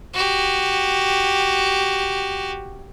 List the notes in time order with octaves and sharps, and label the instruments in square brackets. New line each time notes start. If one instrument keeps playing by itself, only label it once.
[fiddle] F#4 G4